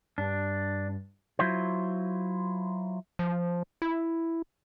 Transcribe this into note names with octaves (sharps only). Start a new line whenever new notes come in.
G2 D4
F#3 E4 F4 C5
F3
E4